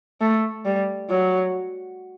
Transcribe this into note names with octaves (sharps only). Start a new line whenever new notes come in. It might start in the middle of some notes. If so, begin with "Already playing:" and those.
A3
G3
F#3